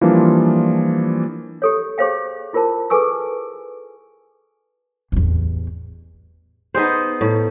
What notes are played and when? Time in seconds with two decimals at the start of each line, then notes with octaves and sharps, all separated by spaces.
0.01 E3 F3 G3 A#3 D4 F4
1.62 G4 A4 C#5
1.98 G4 G#4 C5 C#5 F5 G5
2.53 E4 F4 A#4 C5 A5
2.90 G#4 A4 B4 G#5 C#6 E6
5.12 A1 E2
6.74 B3 D#4 G#4 C5
7.21 A2